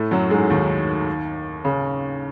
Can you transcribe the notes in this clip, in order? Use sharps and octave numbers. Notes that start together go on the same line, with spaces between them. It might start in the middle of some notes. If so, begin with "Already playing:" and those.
Already playing: A2 A3
F#2 F#3
G#2 G#3
D#2 D#3
C#3